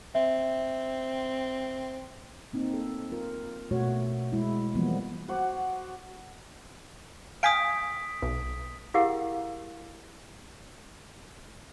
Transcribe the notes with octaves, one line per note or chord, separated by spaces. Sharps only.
C4 E5
A#3 C4 D#4
A4
F4 A#4
B2 A3 F#4 C#5
G#3 E4
E3 F3 G3 A#3 B3
F#4 C5 F#5 D6
F5 G5 G#5 D#6 B6 D7
B1
E4 G4 G#4 A#4 F5 F#5